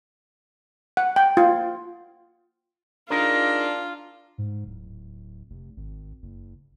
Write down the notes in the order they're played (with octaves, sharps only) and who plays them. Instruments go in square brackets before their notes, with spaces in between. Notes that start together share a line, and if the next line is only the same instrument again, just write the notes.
[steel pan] F#5
G5
F4
[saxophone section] D4 [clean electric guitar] D#4 G#4 A#4 [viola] F4
[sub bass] G#2
D1
F1
G#1
F#1